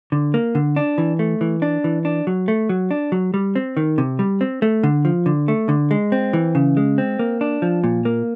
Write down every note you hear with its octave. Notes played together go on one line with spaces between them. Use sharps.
D3
A#3
D3
D4
E3
A3
E3
D4
E3
D4
F#3
A3
F#3
D4
F#3
G3
C4
D#3
C3
G3
C4
A3
D3
F3
D3
A3
D3
G#3
C4
E3
C#3
G#3
C4
A#3
D4
F3
A#2
A#3